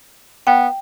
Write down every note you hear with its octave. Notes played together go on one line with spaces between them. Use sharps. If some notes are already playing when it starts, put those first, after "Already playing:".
B3 G5